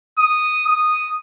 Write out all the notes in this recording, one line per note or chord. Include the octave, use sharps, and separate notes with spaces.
D#6
D#6